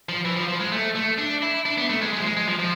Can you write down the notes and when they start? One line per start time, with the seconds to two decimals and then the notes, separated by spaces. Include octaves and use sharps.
0.09 F3
0.25 E3
0.37 F3
0.48 F3
0.61 G#3
0.72 A3
0.96 A3
1.18 D4
1.43 E4
1.66 D4
1.78 B3
1.90 A3
2.01 G#3
2.13 G#3
2.20 F3
2.25 G#3
2.36 G#3
2.48 F3
2.59 F3